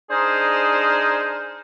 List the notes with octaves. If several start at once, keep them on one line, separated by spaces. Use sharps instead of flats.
D4 D#4 G#4 A#4 C5